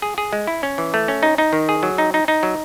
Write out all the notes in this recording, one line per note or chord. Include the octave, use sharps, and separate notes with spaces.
G#4
G#4
G#3
E4
C#4
E3
A3
C#4
D#4
D#4
D#3
G#4
F#3
D#4
D#4
D#4
F#3